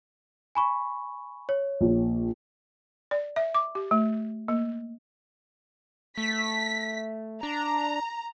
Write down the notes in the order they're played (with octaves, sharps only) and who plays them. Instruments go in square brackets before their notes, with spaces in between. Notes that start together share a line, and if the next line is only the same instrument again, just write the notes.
[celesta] G#5 B5 C#6
C#5
[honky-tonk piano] A#1
[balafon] D5
E5
D6
G4
A3
A#3
[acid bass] A3 [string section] B6
[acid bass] D4 [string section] A#5